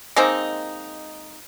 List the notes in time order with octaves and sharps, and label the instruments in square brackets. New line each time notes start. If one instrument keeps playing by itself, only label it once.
[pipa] G#3 A#3 C4 D#4